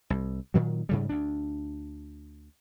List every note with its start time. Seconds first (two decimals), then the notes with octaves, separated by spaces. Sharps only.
0.10 C2
0.54 A#2 D#3 F#3
0.89 G#2 C#3 G3
1.09 D2 D4